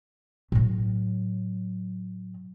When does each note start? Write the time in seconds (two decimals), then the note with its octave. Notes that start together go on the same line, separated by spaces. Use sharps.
0.52 A2 F#3